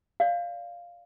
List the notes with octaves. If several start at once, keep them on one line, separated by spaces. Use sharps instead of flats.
D5 F5